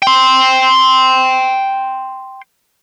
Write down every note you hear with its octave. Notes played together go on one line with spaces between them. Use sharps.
G5 C6